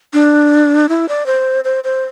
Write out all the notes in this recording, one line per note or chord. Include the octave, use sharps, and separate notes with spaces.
D4
E4
D5
C5
C5
C5